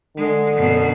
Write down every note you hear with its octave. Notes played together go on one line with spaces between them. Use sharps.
D3 G#3
F#2 B2